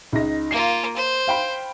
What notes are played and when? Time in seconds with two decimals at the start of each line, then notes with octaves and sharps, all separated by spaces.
0.13 C#2 D#4 A#6
0.51 A#3 F4 C7
0.96 C5
1.28 F5 G5 B5